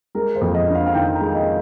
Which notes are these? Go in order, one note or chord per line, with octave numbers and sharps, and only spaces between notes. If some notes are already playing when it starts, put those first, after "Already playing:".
G#3 A#4
C5
F2
D#5
D4
F5
F5
D#3 G5
A#5
G#3
D#5